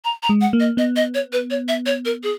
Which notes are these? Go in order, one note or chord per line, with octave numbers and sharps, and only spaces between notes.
A#5
A#5
G#3
F#5
A#3
D#5
B3 D#5
D#5
C#5
B4
C#5
E5
C#5
A#4
G#4